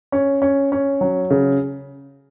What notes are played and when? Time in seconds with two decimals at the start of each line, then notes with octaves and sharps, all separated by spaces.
0.12 C#4
0.42 C#4
0.72 C#4
1.01 F#3
1.31 C#3